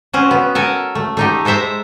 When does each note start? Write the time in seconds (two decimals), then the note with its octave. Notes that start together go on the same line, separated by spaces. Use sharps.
0.13 C4 C#4 F#4
0.31 B3
0.55 A4 A#4 G#5
0.95 A3
1.17 A3 D#4 G4
1.45 G#3 A4 C5 E5 A#5